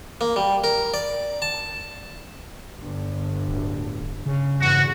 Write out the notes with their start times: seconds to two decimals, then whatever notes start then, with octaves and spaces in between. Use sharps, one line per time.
0.21 A#3
0.36 G3
0.64 A#4
0.94 D5
1.42 A5
2.79 G1 G2 D3
3.48 D1
4.26 C#3
4.61 E2 G2 A#2 F#4